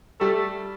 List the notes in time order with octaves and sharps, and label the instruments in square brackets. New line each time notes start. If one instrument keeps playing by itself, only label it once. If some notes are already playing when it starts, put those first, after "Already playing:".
[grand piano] G3 [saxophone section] A3